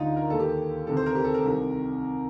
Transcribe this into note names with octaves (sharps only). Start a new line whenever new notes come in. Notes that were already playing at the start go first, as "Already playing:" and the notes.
Already playing: D2 D3 D#4 F4
A#4
D#2 D#3 A4
G4
D2 C3 D#3 A4
C5
A#4
G4
A4
A#4
C2 C3 D#3